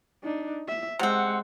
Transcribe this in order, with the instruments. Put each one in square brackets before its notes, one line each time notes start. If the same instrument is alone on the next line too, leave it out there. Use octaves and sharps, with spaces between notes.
[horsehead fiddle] D4 D#4
E5
[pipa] C3 C4 [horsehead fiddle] G#3 [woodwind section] F#5